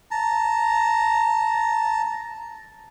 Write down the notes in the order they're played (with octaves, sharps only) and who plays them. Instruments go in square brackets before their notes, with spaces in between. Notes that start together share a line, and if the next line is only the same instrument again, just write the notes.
[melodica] A5 A#5